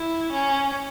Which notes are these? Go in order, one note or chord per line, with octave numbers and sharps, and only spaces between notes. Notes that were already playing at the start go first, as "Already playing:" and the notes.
Already playing: E4
C#4